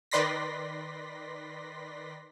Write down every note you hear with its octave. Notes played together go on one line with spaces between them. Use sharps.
D#3 B4 D5 C6 A#6 B6